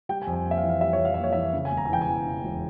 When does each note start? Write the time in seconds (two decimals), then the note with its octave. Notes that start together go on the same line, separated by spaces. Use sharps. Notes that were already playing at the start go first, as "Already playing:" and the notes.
0.09 G3 G5
0.22 G#5
0.27 F2
0.33 G#5
0.45 A#3
0.51 E5
0.58 F5
0.63 E3
0.69 F5
0.81 G3 E5
0.93 C#5
0.99 F2
1.05 F5
1.14 A#3 E5
1.24 C#5
1.33 E3 E5
1.53 C#3
1.65 G#5
1.71 E1
1.77 A#5
1.85 G#5
1.89 E3 G5
2.01 G#5
2.07 E2
2.25 C#3
2.43 E1